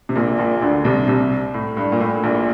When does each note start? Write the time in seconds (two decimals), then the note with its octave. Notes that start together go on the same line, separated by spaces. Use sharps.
0.09 C3
0.16 A#1 A#2
0.39 A#1 A#2
0.62 D2 D3
0.85 C2 C3
1.08 C2 C3
1.54 A2
1.77 G2
1.92 A#2
2.00 A2
2.24 A#1 A#2